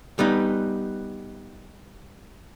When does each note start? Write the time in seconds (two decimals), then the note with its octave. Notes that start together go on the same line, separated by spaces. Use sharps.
0.19 G3 B3 D#4